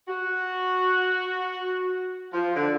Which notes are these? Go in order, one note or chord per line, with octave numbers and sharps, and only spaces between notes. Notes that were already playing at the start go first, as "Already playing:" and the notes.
F#4
F3
D3